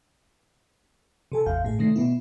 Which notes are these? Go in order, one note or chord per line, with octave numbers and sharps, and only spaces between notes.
C3 A4 G#5 A5
A1 E2 F5 G6
A2 G#4
C3 D#3 A3 A#6 C7
B2 B3 E4